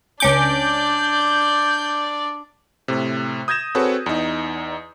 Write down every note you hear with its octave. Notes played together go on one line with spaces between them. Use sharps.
C#2 C#4 D4 D5 D6 G6
A2 C3
D#6 G6 G#6 A#6 E7
C4 F#4 G#4 A4 B4 C#5
E2 D#4